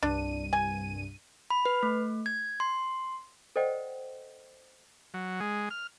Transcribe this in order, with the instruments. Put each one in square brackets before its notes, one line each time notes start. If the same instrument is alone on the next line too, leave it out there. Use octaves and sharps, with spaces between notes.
[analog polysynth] C2 G2 D#7 [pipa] D4
[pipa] G#5
[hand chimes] B5
B4
A3
G#6
C6
[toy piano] A4 C5 D5 D#5 F#5 G5
[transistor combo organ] F#3
G#3
F6